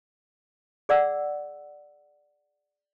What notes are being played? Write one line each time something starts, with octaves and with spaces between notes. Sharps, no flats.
G#4 D5 F#5 E6